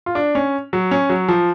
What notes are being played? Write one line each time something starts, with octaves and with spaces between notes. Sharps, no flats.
F4
D4
C#4
F#3
C#4
F#3
F3